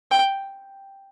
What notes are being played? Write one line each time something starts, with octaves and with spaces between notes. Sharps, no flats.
G5